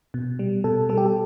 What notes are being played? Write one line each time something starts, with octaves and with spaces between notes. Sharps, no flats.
B2
G3
B2 A4
G3 A4
G4
A4